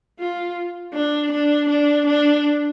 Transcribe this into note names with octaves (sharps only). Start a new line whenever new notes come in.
F4
D4
D4
D4
D4